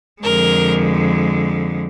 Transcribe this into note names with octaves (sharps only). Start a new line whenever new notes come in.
F2 D3 G#3 A#4